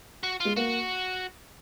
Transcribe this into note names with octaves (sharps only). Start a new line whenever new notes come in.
F#4
G#3 F4
A#3 F#4